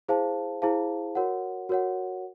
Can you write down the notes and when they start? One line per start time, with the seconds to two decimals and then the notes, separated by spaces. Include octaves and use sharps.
0.08 E4 G#4 C5 F5 A5
0.62 E4 G#4 C5 F5 A5
1.15 F#4 A#4 C#5 F#5
1.69 F#4 A#4 C#5 F#5